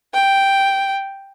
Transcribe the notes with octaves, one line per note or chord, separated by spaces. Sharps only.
G5